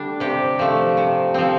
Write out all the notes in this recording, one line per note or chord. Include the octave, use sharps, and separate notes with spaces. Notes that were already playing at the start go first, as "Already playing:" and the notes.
Already playing: D3 G3 A3 D4
C3 G4
F3 A3
C3
F3 C4